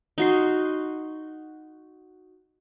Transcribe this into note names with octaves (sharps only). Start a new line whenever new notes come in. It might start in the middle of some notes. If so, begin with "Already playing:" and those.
D#4 F#4 C6